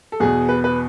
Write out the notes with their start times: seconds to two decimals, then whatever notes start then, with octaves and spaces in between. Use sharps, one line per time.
0.12 A4
0.20 E2 B2 G#4
0.49 B4
0.64 B4